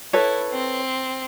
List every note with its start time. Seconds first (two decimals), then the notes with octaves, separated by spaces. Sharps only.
0.13 E4 A4 B4 C#5
0.50 C4